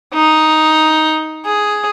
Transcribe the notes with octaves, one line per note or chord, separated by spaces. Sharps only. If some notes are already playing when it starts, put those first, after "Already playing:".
D#4
G#4